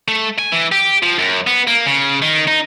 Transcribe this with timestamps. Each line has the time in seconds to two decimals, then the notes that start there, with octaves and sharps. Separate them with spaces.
0.08 A3
0.39 G#5
0.52 E3
0.72 G4
1.03 F3
1.19 F#2
1.47 B3
1.67 A#3
1.86 C#3
2.22 D#3
2.48 D#4